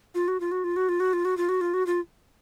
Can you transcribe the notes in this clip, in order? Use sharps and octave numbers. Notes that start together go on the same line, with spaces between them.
F4
F#4
F4
F#4
F4
F#4
F4
F#4
F4
F#4
F4
F#4
F4
F#4
F4